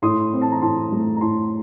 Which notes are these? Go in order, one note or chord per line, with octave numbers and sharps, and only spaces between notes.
A2 C6 D#6
C4
A5
A#5
A2 A5 C6
A3
A#5
A2 A5 C6